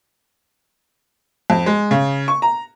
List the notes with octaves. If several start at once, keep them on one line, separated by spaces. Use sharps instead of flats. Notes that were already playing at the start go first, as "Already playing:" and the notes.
F2
G#3
C#3
C#6
A#5